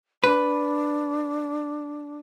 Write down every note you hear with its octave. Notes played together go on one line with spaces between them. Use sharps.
D4 B4